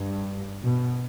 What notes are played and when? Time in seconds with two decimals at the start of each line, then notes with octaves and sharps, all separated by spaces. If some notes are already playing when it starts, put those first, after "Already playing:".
Already playing: G2
0.63 B2